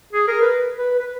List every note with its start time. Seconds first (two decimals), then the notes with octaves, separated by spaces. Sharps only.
0.13 G#4
0.28 A#4
0.41 B4
0.78 B4
0.99 B4